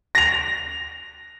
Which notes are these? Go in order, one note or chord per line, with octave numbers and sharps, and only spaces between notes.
A#6 F7